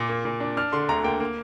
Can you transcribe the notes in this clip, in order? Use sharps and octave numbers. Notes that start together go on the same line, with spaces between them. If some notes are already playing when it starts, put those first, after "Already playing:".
Already playing: A#2 D6
A#3
A#2
D4
D4 F6
D3 C6
D2 A#5
A#3 G5
A#3